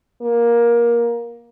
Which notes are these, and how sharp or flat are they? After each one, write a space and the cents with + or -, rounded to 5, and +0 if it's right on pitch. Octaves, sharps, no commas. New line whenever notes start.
A#3 +15